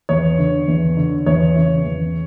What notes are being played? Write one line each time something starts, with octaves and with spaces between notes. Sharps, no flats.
E2 C#5
D3
E2
D3
E2 C#5
C#3 E3
E2